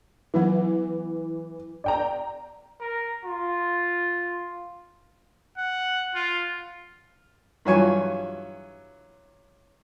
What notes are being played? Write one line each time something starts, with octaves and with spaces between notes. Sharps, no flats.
E3 F#3 B3 F#5
D5 G5 A#5
A#4
F4
F#5
F4
G2 E3 F#3 F4 G#5 C#6